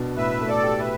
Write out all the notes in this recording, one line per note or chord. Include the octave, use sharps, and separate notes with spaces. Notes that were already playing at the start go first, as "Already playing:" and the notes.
Already playing: B2 D4
A2 B4 E5
A3
A4 D5
G4
B4 E5